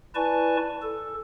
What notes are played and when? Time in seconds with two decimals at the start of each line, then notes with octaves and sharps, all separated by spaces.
0.15 E4 B4 D5 G#5 A5 C#6
0.82 A4